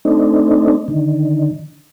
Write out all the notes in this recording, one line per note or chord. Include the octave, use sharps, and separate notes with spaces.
A3 C4 D4 D#4
D3 D#3